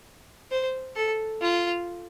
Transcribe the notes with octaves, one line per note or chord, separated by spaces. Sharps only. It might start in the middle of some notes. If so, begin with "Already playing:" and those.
C5
A4
F4